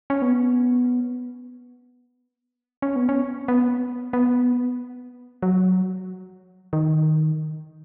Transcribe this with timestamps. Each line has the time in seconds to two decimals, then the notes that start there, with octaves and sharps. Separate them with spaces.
0.10 C#4
0.22 B3
2.82 C#4
2.96 B3
3.09 C#4
3.48 B3
4.13 B3
5.43 F#3
6.73 D#3